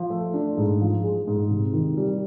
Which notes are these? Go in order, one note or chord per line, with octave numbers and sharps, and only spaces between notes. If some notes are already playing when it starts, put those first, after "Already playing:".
Already playing: F3
A3
D4
G#2
F3
G#3
G#2
C3
D#3
G3